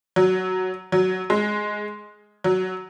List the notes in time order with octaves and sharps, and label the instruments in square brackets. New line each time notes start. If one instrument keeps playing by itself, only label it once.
[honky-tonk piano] F#3
F#3
G#3
F#3